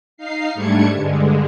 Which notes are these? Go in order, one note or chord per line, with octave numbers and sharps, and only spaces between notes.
D#4 F5 C7
G#2 G3 A3 D4 G#6 C#7
G2 D3 G#3